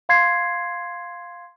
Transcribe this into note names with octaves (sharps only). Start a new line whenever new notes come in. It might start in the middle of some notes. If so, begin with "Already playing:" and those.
F5 C6 G#6 C7